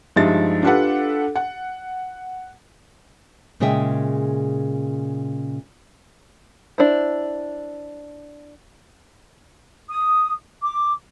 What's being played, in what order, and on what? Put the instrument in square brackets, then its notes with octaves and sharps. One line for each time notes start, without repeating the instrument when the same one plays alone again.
[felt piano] G2 F3 G#3 D#4 E5 A6
D4 F4 G4 A4 B4 F#5
F#5
[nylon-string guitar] A#2 C#3 G#3 G#4 E5 G5
[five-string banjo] D4 E4 C5
[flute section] D#6
D6